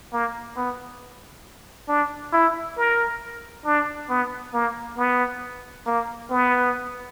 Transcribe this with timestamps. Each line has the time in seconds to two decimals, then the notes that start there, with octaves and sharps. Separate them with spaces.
0.12 A#3
0.57 B3
1.88 D4
2.33 E4
2.77 A#4
3.66 D4
4.09 B3
4.53 A#3
4.97 B3
5.86 A#3
6.30 B3